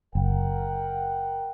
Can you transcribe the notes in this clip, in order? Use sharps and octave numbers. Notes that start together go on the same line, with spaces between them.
F#1 A#4 F#5 G5